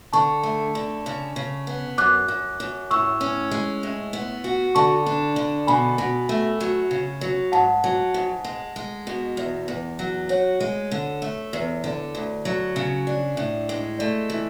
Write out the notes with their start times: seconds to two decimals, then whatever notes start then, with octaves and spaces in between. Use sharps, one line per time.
0.13 D3 A5 C#6
0.43 A3
0.75 D3
1.06 C#3
1.36 C#3
1.67 B3
1.98 F#2 D6 F#6
2.28 F#2
2.60 F#2
2.90 A2 C#6 E6
3.21 C#4
3.51 G#3
3.83 A2
4.13 B3
4.44 F#4
4.75 D3 A5 C#6
5.06 D4
5.36 D3
5.67 B2 G#5 B5
5.98 B2
6.29 A3
6.60 F#3
6.91 C#3
7.21 F#3
7.52 G#2 F#5 A5
7.84 F#3
8.14 G#2
8.44 G#3
8.76 G#3
9.07 B2
9.37 E2
9.68 E2
9.99 F#3
10.29 F#4 C#5
10.60 G#3
10.91 D3
11.22 A3
11.53 E2
11.84 D3
12.15 D2
12.45 F#3
12.76 C#3
13.07 D4
13.37 A2
13.69 G#3
13.99 A3 D5
14.30 E3